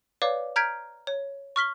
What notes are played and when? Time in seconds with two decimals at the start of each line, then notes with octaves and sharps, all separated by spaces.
0.22 B4 C#5 D5 F5 D6
0.56 A#5 F6 G6 G#6 B6 D7
1.07 C#5
1.56 C#6 F6 B6 G7